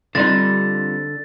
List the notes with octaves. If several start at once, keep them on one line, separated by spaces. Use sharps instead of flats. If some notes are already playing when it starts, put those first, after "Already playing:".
D3 G3 C4 D4 D#4 F4 A6